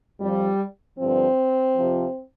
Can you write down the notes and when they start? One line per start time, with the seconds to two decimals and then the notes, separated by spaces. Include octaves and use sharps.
0.20 F2 F3 G3
0.98 G2 D3 F3 C4
1.77 F2 C3 F3